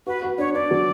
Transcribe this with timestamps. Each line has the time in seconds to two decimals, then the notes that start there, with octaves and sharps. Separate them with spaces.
0.07 F#4 B4
0.23 F#4
0.38 D4 C#5
0.54 D4 D5
0.71 F#3